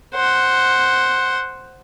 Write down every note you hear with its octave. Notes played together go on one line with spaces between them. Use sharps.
C5 F#5